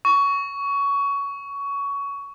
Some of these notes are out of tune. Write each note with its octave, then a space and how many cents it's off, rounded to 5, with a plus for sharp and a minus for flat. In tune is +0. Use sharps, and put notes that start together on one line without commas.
C#6 +20